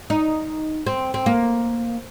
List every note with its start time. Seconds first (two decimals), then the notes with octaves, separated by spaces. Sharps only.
0.10 D#4
0.87 C4
1.14 C4
1.26 A#3